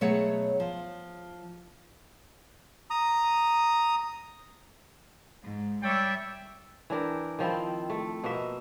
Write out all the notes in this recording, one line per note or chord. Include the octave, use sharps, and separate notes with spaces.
B2 F#3 A3 G#4 C#5 F#5
F3
A#5 D#6
G#2
G3 C#5 D5 E5 G5
E3 D4 A#4 G5
D#3 F3 C4 E4
A3
B2 A#3 D#5 E5